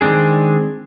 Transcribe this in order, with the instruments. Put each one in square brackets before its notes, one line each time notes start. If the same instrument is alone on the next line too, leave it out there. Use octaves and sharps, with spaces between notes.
[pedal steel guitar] D#3 G#3 C4 D4 G#4